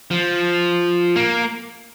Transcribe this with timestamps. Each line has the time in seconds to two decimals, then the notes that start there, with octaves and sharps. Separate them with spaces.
0.11 F3
1.16 A#3